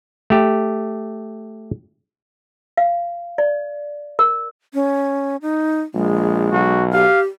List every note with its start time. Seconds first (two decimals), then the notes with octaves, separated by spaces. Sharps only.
0.30 A3 G4
2.77 F5
3.38 D5
4.19 A#4
4.74 C#4
5.42 D#4
5.94 A#1 G#3
6.52 B1 F#4
6.93 G4 F5